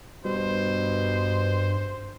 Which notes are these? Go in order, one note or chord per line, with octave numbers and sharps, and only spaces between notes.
G2 B2 C5